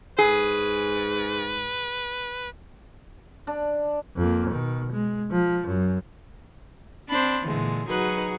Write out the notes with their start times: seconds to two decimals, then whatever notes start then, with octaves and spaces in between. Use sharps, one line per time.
0.19 G#2 G#4 B4
3.47 D4
4.17 F2 A#3
4.49 B2 D#3
4.91 G#3
5.31 F3
5.67 F#2
7.09 C4 D4 C5 B5
7.46 A#2 D3 E3 G#3
7.88 F#3 D#4 F#4 G#4 B4